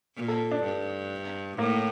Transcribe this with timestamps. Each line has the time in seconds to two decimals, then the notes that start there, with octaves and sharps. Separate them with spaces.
0.16 A#2
0.28 A4
0.51 D4
0.64 G2
1.58 A2 A#3